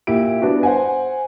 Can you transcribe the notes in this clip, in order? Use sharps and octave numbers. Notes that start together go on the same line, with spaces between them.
A#2 E4 G4 D7
G3 B3 D4 F#4
C5 F#5 G#5